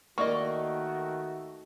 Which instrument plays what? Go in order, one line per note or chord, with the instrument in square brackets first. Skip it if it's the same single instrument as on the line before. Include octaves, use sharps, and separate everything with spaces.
[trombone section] D#3 A3 F#4 [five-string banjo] A#3 D5 D#5 [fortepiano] C#6